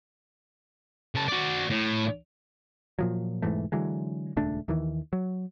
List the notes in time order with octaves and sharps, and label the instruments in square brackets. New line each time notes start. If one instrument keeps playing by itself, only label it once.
[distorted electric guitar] C#3 A5
F#4 D5
A2
[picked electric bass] A#2 F3 F#3
E1 G#2 E3 A3
D3 E3 F#3 G#3
D#1 C#2 A3 D4
D#2 D#3 E3
F#3